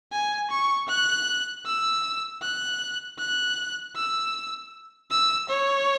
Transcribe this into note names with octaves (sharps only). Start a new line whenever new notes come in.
G#5
C#6
F#6
E6
F#6
F#6
E6
E6
C#5